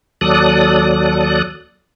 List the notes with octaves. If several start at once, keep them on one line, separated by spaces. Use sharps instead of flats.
D#2 F#3 A4 D5 D#6 F#6